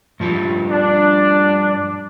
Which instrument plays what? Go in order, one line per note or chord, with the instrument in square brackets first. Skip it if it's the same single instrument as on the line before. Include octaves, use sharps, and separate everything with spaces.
[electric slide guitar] G2 F3 G3
[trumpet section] D4